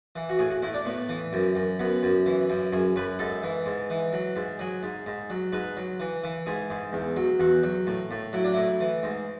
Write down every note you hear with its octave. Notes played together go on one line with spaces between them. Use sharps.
E3
F#4
A2 G#4
F#4
A2 E4
D4
A2 B3
E3
F#2
F#2
F#2 B3
F#2
E3
F#2
F#2 G#4
F#2 B4
G#2 A4
E3
G#2
E3
F#3
G#2
F#3 G#4
G#2
G#2
F#3
G#2 B4
F#3
E3
E3
G#2 G#4
G#2
E2
F#3
E2 F#4
F#3
A2
A2
F#3 E4
D4
A2 E4
E3
G#2